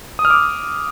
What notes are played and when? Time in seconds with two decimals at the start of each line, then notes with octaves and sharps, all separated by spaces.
0.19 D#6
0.25 F6
0.30 D6